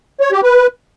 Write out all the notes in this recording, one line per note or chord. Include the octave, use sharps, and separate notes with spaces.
C#5
G4
B4